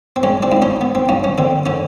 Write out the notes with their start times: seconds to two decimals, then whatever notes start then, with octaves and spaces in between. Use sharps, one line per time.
0.16 C4
0.23 G#3 C#4
0.43 C4 D4
0.52 G#2
0.62 C#4 D#4
0.81 B3
0.95 C4
1.09 G2 C#4
1.24 C#4
1.38 D3 C4
1.66 D3 C#4